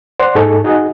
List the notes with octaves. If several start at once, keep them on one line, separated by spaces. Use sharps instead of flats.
C5 D5 F#5 C6
G#2 D#4 G#4 A4 C#6
D#4 F#4 G#4 D#5